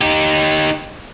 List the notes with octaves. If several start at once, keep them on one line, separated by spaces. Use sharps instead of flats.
D#4 G4